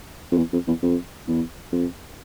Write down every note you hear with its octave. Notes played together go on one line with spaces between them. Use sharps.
F2
E2
F2
E2
F2
E2
F2